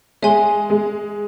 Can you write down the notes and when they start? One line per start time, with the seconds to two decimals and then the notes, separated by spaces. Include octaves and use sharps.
0.22 G#3 C#5 E5 G#5 C6
0.70 G#3